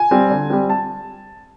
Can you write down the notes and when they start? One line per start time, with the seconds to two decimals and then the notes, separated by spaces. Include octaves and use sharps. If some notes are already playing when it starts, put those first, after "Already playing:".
Already playing: G#5
0.11 G3 C4
0.30 D3
0.50 G3 C4
0.70 A5